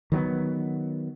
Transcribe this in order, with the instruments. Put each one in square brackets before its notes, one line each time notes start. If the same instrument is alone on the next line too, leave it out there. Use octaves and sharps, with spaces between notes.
[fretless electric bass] D#3 F#3 G3 B3